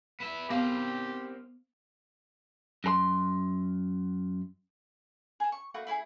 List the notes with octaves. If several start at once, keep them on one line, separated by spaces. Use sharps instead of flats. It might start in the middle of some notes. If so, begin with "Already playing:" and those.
B3 E5
B3 C4 G4 A#4 F5 D6
F#2 A4 C6
G#4 A4
C#6
A3 A#3 F#4 B4
A3 E4 F#4 G#4